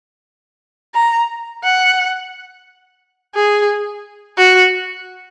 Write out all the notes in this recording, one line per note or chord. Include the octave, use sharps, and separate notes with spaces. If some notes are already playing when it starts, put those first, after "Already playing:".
A#5
F#5
G#4
F#4